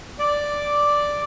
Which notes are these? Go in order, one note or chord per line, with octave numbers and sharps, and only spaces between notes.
D5